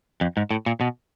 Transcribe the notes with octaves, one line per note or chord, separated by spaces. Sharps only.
F2
G#2
A2
A#2
B2